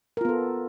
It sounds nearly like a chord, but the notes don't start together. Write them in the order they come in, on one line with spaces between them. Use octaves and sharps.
A#4 F4 B3 A4